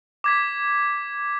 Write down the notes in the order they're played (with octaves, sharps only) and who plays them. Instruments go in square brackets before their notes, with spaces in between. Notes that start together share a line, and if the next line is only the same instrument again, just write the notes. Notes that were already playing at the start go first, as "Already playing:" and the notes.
[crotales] D6 G#6 B6